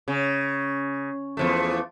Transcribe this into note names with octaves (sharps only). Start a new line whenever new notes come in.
C#3
E2 F3 A3